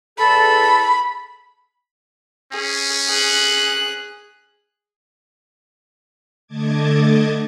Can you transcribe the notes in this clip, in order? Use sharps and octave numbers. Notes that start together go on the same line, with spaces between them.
E2 A4 B5
C#4 G#4
G#4 F#6
D3 A3 D#5 A5 D6 G#6